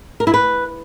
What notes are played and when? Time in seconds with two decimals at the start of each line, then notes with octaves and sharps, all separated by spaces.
0.20 A#4
0.27 E4
0.34 B4